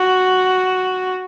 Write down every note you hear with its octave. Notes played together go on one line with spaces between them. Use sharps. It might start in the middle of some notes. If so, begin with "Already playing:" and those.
Already playing: F#4